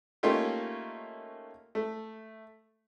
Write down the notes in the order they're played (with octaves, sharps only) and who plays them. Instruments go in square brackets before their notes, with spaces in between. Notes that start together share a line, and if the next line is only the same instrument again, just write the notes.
[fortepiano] A3 A#3 C#4 D#4 F4 G4
A3